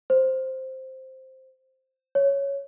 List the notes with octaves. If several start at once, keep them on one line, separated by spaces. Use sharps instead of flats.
C5
C#5